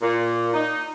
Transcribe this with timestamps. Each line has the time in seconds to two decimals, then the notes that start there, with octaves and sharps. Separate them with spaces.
0.02 A#2
0.54 D#4